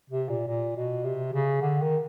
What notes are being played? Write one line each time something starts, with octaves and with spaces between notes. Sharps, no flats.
C3
A#2
A#2
B2
C3
C#3
D3
D#3